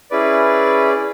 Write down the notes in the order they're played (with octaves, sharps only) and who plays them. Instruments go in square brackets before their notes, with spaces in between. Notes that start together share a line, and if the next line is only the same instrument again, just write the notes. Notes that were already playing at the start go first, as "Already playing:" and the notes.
[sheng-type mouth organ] C#4 E4 G#4 B4 D5